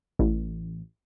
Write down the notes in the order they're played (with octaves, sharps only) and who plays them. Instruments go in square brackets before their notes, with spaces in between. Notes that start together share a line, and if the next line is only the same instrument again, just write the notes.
[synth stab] A1